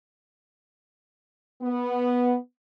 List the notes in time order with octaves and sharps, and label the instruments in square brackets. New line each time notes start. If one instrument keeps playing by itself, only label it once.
[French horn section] B3